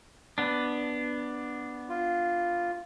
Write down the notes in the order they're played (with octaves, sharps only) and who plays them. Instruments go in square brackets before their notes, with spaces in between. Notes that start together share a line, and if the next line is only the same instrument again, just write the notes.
[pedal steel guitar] B3 D4
[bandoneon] F4